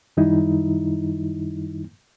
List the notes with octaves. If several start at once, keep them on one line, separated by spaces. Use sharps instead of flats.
F#2 D#3 G3 D#4 E4